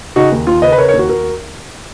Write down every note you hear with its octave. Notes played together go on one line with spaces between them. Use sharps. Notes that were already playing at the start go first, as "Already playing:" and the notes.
C#3 D#4 F#4
D#2
D#2 F4
C#3 B4 D#5
B4
C#3 A#4 C#5
A#4 C#5
D#2
F#4 A#4
D#2 F#4 A#4